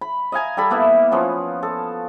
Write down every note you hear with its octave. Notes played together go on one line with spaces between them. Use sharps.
B5
D#5 F5 G#5 A#5
G3 A4 B5
A#3 B3 E4 E5
F3 B3 C#4
A4